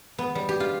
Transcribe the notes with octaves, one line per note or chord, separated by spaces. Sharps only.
B3
G3
G4
F4